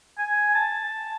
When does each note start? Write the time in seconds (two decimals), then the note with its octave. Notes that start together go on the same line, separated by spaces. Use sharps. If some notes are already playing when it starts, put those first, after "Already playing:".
0.18 G#5
0.55 A5